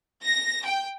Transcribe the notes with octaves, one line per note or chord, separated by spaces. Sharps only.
A#6
G5